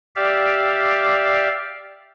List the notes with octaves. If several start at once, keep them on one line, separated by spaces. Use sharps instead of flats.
G4 D5 E5 F5